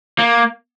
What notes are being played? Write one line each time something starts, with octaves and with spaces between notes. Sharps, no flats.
A#3